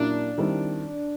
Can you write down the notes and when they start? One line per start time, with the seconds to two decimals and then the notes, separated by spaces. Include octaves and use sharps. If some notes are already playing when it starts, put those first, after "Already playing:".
Already playing: A#2 F#3 A#3 C#4 D4 E4
0.38 D#3 G3 C4 E4